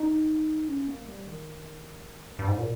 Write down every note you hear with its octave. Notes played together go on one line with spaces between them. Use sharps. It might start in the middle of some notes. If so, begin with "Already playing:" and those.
Already playing: D#4
C#4
A#3
G3
D#3
G2
G#2
A#2